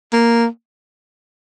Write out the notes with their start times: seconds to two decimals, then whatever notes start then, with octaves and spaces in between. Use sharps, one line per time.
0.13 A#3